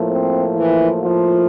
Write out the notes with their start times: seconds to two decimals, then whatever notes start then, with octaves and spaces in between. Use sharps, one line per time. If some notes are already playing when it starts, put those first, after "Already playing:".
Already playing: A2 F3 A#3
0.11 C4
0.57 E3 E4
1.03 F3 F4